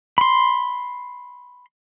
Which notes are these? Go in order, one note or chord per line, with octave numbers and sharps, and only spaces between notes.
B5 C6